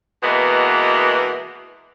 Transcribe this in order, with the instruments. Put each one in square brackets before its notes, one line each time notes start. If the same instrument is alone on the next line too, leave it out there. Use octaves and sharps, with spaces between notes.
[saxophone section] B2 E3 G#3 A#3 B3